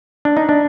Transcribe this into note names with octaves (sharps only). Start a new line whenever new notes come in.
D4
D#4
D4